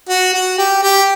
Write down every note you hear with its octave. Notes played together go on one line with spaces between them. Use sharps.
F#4
F#4
G4
G4